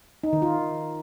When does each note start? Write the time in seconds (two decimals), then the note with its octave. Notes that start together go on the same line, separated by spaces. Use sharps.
0.24 D#4
0.33 D#3
0.42 F4